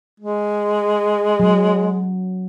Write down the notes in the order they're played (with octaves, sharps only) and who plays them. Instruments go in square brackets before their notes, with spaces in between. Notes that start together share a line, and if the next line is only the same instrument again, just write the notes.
[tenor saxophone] G#3
[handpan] F#3